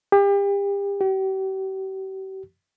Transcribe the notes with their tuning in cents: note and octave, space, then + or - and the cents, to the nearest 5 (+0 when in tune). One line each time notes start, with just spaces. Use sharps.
G4 +35
G4 -40